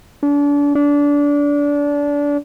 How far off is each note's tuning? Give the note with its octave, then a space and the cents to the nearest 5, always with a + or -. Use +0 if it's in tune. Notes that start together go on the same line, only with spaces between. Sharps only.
D4 -35
D4 -25